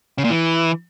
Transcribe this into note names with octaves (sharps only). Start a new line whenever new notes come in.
C#3
A#2
E3